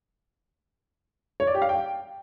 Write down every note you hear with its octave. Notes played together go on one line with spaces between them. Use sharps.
C#5
D5
G4
F5
G5